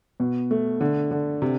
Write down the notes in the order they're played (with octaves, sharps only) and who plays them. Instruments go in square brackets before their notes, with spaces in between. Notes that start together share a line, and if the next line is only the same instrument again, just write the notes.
[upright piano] B2
A3
D3
D3
C3